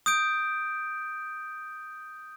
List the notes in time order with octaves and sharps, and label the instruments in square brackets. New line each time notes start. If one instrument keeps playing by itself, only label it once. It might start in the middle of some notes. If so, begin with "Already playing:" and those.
[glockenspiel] D#6 G6 D7